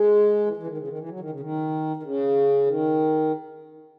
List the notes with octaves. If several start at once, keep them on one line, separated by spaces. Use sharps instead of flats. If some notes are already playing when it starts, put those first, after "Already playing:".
Already playing: G#3
E3
E3
C#3
D#3
C#3
D#3
E3
F#3
D#3
C#3
D#3
D#3
C#3
D#3